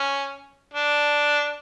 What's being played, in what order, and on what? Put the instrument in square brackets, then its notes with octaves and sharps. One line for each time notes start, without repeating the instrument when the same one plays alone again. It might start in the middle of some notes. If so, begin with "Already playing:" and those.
Already playing: [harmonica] C#4
D4